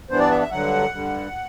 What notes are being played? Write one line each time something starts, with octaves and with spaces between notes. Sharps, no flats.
G2 E3 B3 D4 C5
D5
E5
E5
G2 D3 F#3 F#5
G2 D3 G3